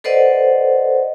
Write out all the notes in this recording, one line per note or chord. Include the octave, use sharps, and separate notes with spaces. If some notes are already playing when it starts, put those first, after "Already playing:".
A4 B4 C5 D5 D#5 F#5